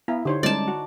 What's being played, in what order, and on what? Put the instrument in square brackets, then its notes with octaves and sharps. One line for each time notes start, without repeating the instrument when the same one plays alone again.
[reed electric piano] B3 F5 A#5 [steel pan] E4
[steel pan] D3 C5 C#5 [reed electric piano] D4 D#4 G4
[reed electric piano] G3 G#3 C#4 [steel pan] D#4 [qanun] D5 A5
[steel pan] F#4